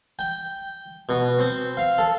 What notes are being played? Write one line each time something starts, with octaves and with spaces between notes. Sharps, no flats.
G5
B2
C4
F5
A4